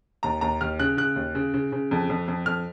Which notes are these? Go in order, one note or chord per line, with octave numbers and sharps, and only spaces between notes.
D#2 A#5
D#2 A#5
D#2 F6
C#3 F#6
C#3 F#6
D#2
C#3
C#3
C#3
F2
F2
F2
F2 F6